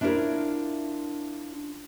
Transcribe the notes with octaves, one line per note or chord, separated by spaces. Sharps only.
D4 E4 F4 G#4 A#4 C#5